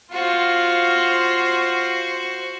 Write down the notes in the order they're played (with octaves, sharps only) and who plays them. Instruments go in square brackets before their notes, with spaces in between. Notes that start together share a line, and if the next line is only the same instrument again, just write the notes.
[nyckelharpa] F4 [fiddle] F#4 C5